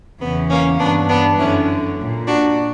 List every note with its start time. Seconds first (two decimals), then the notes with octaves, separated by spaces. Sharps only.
0.21 E2 C#3 E3 B3
0.51 A#3 C#4
0.80 G2 E3 B3 D4
1.10 B3 D4
1.40 F#2 D3 C#4 E4
1.98 A#2
2.28 D4 F#4